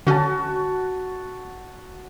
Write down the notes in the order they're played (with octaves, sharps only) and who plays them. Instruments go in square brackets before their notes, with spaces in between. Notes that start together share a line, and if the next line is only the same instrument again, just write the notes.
[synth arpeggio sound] D3 C#4 [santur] F#4 A5